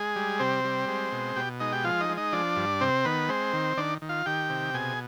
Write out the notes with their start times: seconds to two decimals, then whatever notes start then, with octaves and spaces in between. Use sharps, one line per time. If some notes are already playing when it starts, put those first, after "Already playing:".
Already playing: G#3 G#4
0.16 G3
0.39 C3 C4 C5
0.64 G3
0.88 G#3
1.12 B2
1.36 B2 G4 G5
1.60 G#3 D#4 D#5
1.72 G4 G5
1.84 F3 F4 F5
2.00 D#4 D#5
2.09 G#3
2.17 D#4 D#5
2.32 F3 D4 D5
2.56 G2
2.80 C3 C4 C5
3.05 D#3 B3 B4
3.29 G#3 C4 C5
3.53 D#3
3.77 D#3 D4 D5
4.02 D#3
4.09 F4 F5
4.26 D#3 G4 G5
4.50 C3
4.74 B2 G#4 G#5